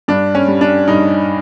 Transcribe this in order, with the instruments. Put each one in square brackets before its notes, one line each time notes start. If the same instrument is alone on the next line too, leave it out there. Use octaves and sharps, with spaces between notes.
[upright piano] G2 D4
C#4
G3
D4
G2 D#4